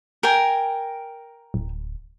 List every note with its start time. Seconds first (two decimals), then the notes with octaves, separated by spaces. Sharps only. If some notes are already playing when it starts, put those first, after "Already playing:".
0.23 A#4 G5 G#5
1.54 D1